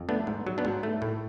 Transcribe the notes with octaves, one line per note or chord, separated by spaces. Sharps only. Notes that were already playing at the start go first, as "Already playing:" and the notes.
Already playing: F2
A3 B3 D4
G#2
F#3
B3 D4
G#2
A3
A2